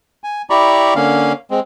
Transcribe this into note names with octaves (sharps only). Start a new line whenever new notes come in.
G#5
E4 G4 D5 A#5 B5 C#6
D3 A#3 C#4 F5
G#3 C4